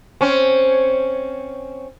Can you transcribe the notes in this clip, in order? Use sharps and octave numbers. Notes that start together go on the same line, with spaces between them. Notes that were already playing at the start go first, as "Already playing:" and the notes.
C4 C#4